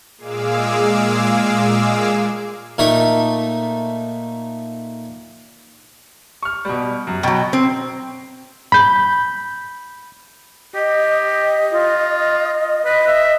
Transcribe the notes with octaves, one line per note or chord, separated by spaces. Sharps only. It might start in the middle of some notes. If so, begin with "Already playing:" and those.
A#2 G#3 G#4 F5 D6 E6
A#2 A3 D#4
C#6 F6
B2 G3
F#2
B2 F#3 G5 B5
C4
B5 G6
G4 D#5
F4
B4 D#5
E5